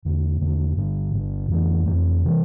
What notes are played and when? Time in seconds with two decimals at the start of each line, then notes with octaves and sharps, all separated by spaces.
0.05 E2 D3 A3
0.41 E2 D3 A3
0.77 G1 G2 D3
1.13 G1 G2 D3
1.50 F2 E3 A3
1.86 F2 E3 A3
2.24 C3 E3